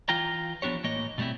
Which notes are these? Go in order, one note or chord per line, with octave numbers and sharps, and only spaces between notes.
E3 F4 G5 A#5
F3 B3 D4 G4 C#5
A2 E3 A#3 C#5 D#5
B2 G3 A3 C4 E4